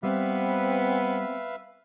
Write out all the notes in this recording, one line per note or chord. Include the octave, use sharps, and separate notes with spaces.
G3 B3 C4 B4 C5 E5 F5